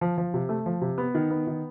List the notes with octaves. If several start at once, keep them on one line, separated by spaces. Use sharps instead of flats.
F3
F3
C3
A3
F3
C3
B3
D#3
B3
D#3